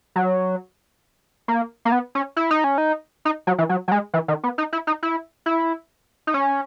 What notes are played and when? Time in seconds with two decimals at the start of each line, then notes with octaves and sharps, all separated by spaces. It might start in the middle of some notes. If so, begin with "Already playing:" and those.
0.16 F#3
1.48 A#3
1.85 A#3
1.92 B3
2.15 C#4
2.37 E4
2.51 D#4
2.64 C#4
2.78 D#4
3.25 D#4
3.47 F#3
3.58 E3
3.69 F#3
3.88 F#3
3.92 G#3
4.14 E3
4.28 D#3
4.44 B3
4.58 D#4
4.73 E4
4.87 D#4
5.03 E4
5.46 E4
6.27 D#4
6.34 C#4